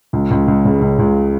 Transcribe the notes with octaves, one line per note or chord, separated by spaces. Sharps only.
C#2
C#2
C#2
C#3
C#2
C#2